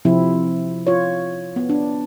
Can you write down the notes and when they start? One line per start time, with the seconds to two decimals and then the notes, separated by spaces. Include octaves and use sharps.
0.05 C3 F3 C4 E4
0.87 F4 C#5
1.56 B3
1.69 D4